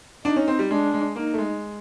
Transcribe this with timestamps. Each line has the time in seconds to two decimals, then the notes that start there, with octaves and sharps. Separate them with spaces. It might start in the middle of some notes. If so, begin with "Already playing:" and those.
0.25 D4 D#4
0.36 C#4
0.48 C4
0.59 G3
0.70 G#3 D4
0.94 G#3
1.16 A#3 D#4
1.34 A3
1.38 G#3